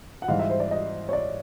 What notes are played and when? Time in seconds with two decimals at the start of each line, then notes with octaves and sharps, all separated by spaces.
0.22 F#5
0.28 G#2 E3 G3 F5
0.39 E5
0.50 C5
0.60 D5
0.71 D#5
1.09 C#5
1.13 D5